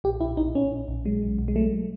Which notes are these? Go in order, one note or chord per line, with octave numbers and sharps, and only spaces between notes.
A#1 G4
A#1 E4
A#1 D#4
A#1 C#4
A#1
A#1
F#3 G#3
B1
B1
G#3
F#3 A3